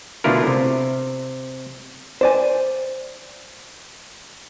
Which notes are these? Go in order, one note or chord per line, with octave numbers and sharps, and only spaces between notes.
B2 D3 A3 E4 F4 A#4
C3
C5 D5 G#5